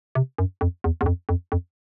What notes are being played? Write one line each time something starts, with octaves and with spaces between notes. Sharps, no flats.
C3
F#2
F2
E2
E2
F2
F2
F2